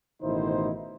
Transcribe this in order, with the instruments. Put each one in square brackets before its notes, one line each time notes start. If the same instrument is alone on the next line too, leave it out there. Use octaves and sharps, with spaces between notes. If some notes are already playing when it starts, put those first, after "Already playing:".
[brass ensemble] A1 B2 D#3 D#4 E4 C5